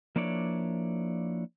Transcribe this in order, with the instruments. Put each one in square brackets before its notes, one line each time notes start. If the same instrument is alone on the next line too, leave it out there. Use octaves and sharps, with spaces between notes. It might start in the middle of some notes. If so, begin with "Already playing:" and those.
[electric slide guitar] F3 A#3 D4 E4 C#5 D5